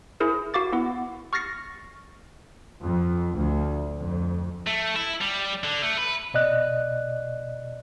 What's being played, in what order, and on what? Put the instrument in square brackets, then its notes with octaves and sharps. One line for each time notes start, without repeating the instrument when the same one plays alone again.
[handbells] E4 G#4 A#4 C5
F#4 F5 D6 A6
B3 E4 F#5
C#6 F6 A6 A#6 C7 C#7
[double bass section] F2
D2
F2
[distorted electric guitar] A3
E4
G3
D3
A3
B4
[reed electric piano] B2 D5 D#5 F#6